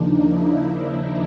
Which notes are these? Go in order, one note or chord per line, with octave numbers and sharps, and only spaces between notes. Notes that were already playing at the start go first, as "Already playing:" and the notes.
Already playing: D#2 C#3 F3 A#3 D4 D#4
E4
D4